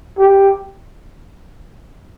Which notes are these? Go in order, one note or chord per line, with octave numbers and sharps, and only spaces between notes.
G4